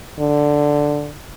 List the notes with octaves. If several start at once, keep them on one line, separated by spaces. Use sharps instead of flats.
D3